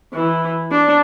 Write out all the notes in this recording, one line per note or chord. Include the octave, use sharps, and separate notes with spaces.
E3
D4